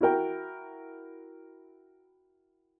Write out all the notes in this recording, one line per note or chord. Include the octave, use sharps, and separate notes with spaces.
E4 F#4 A#4 G5